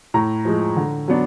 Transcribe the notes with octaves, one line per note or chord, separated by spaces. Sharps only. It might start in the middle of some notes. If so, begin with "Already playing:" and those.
A2 A#5
F3 G#3
D3
F#3 B3 D4